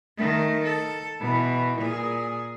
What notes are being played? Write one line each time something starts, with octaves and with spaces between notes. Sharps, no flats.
D#3 A3
A4
B2 E3
A#2 G#4